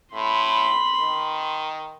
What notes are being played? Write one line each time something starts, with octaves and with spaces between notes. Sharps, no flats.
A2 B5 C6
D#3